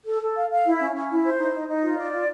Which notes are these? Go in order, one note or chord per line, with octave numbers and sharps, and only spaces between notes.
A4
A4
F5
F5
E4
C#4
C#4
E4
C5
D#4
D#4
D#4
F4
D5
F4